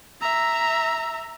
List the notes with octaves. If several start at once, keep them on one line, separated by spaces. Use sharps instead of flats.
E5 A#5